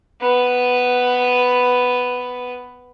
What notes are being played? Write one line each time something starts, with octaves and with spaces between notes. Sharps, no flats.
B3 B4